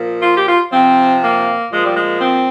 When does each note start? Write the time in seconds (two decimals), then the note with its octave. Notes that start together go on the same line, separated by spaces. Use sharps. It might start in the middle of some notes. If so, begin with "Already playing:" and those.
Already playing: A#2 F3
0.22 F4
0.35 G4
0.47 F4
0.72 C3 F3 C4
1.22 A#3
1.71 A#2 F3 G#3
1.83 G3
1.95 G#3
2.21 C4